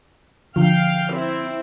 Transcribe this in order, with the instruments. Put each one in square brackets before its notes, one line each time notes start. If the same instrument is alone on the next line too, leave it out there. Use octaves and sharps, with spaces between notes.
[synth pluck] D3 F3 [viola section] F5 G5
[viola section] C4 E4